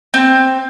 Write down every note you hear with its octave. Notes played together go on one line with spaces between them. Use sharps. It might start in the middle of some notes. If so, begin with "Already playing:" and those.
C4